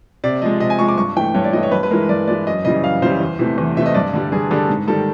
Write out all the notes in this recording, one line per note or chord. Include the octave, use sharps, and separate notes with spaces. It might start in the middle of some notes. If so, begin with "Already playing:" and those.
C3 D5
F3 G#3 D#5
C3 D#5
G#5
F3 G#3 C#6
D6
G2 C#6
E3 A3 G5
G2 C#5
D5
E3 A3 D#5
C#5
G2 B4
B4
E3 G#3 A#4
G2 D5
E3 G#3 D5
F#2 D#5
C#3 E3 G3 D#5
F#2 F5
C#3 E3 G3 C5
E2
C3 E3 A3
E2
C3 E3 A3 E5
D#5
G2 D5
D3 G3
G2 G#4
D3 G3 A4
G#2
D#3 G3 A4